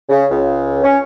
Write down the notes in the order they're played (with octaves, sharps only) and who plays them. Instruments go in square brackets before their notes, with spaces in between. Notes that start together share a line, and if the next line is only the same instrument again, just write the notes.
[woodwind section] C#3
C#2
C#4